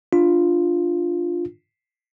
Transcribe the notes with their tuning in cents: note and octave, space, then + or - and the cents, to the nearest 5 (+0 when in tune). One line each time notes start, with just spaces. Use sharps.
D4 +10 F4 +0